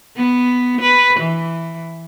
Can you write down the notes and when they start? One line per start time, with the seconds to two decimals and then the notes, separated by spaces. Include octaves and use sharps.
0.17 B3
0.81 B4
1.19 E3